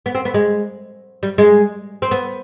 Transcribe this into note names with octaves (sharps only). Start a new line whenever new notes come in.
B3
C4
B3
G#3
G3
G#3
C4
B3